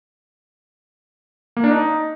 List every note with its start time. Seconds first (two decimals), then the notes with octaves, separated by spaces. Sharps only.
1.57 A#3
1.64 D4
1.71 D#4